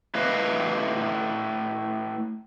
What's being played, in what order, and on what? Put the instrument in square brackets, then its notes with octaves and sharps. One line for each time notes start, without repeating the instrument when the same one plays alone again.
[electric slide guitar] A3 E4 B4 D#5 F5